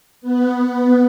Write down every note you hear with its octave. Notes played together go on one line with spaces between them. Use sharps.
B3